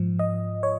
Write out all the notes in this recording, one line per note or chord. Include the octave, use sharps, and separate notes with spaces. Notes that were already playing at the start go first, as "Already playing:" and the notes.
Already playing: G#2 F3
D#5
C#5